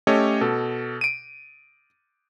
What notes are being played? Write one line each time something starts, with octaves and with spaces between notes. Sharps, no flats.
A3 C#4 G4 A4 C#5 D#5
B2 A4
D7 D#7